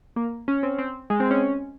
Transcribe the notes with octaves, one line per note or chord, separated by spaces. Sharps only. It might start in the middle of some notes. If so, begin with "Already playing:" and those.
A#3
C#4
C4
C4
G#3
C4
C#4